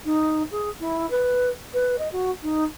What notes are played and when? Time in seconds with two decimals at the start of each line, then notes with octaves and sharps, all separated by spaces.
0.05 D#4
0.51 G#4
0.80 E4
1.11 B4
1.74 B4
1.99 D#5
2.12 F#4
2.43 D#4